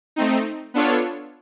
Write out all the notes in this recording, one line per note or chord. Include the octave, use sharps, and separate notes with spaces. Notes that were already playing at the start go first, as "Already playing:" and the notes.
A3 C4 D#4
B3 D4 F4 A4 C#5